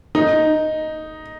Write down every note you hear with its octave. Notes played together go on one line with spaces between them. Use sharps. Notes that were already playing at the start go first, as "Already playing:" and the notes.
D#4